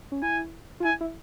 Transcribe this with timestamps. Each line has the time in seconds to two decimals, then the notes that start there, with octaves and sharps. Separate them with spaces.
0.12 C#4
0.22 E4 G#5
0.80 F4
0.85 E4 G#5
1.01 E4